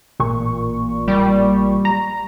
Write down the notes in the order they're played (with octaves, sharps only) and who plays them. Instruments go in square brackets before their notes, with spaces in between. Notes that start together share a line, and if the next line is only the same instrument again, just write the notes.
[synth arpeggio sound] A1 A#2 C#6
[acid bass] G3
[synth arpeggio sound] A#5